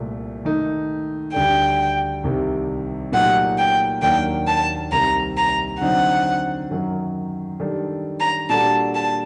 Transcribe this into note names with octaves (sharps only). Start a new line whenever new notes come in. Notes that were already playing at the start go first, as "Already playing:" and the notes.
Already playing: C2 A#2 A3
D#3 A3 D#4
D2 D3 G3 D4 A4 G5
C2 C3 D#3 G3
A#2 F#3 A3 D#4 G4 F#5
G5
D#2 D#3 F#3 A#3 D4 G5
A5
C2 C3 D#3 G3 A#5
A#5
D3 F#3 C4 D#4 F#5
F#2 D#3 F#3
D#3 G3 D4 A4
A#5
A#2 G3 D4 F#4 A4 A5
A5